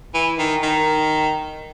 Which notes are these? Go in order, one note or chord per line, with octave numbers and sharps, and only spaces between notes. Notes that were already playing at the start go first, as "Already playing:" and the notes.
E3
D#3
D#3